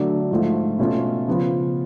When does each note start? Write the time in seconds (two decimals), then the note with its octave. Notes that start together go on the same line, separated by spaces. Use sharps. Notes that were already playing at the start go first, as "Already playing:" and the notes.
Already playing: D3 F#3 A3 D4
0.31 G#2 F3 A3 F4
0.79 B2 A3 C#4 F4
1.27 C#3 F3 B3 F4